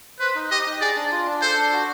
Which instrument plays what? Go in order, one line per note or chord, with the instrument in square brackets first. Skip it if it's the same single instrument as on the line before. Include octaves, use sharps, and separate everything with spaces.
[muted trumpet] B4 [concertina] C5
[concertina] D#4
[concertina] G4 [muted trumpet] D#5
[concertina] D#4
[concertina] G#4 [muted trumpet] D5
[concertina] D4
F4
D4
[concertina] A4 [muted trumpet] C5
[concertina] D4
F#4